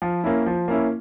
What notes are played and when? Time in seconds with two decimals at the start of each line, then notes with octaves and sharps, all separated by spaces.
0.02 F3
0.24 A#3 C#4 E4
0.46 F3
0.68 A#3 C#4 E4